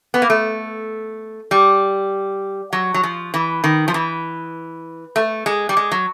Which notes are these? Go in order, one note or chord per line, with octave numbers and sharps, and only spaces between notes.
B3
A#3
A3
G3
F#3
F#3
F3
E3
D#3
F3
E3
A3
G#3
G3
G#3
F#3